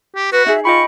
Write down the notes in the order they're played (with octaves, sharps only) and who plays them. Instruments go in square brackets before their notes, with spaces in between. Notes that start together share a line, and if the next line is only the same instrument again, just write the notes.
[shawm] G4
[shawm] F#4 [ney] B4
[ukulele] D#4 G#4 [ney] E5
[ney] F4 [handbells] D#5 G5 B5 [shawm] C#6